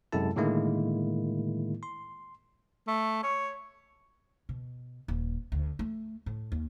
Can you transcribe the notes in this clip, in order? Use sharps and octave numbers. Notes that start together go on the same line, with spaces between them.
F#2 C3 G#3 E4 A4 A5
A2 D3 D#3 G#3 A#3 E4
C6
A3
C#5
B2
D#1
D2
A3
A2
D#2